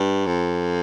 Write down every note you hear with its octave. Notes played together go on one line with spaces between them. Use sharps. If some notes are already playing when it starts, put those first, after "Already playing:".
Already playing: G2
F2